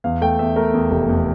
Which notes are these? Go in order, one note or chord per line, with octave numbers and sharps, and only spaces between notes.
E2 F5
A3 G5
E2 E5
A3 A#4
E2
F1
E2